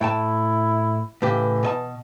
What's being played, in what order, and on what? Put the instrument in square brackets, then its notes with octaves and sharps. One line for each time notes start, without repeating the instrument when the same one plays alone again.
[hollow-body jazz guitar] A2 G5 A5 [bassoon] E4
[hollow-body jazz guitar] A2 C#3 G4 [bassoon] E3
[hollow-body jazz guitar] B2 D#5 A5